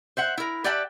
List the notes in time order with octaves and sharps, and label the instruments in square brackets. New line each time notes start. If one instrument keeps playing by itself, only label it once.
[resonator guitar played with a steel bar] C5 E5 F#5
E4 A#4
G4 D5 E5 F#5 G5 A5